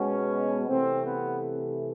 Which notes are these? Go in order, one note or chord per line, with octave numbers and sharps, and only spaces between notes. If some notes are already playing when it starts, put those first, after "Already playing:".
Already playing: B2 G#3 C#4
C3 E3 A3 C4
B3